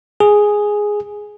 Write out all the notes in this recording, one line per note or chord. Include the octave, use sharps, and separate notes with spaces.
G#4